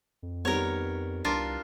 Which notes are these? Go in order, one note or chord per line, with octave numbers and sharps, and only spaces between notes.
F2
D#3 G3 B3 A#4 C#5
C2 D4 F4 A#4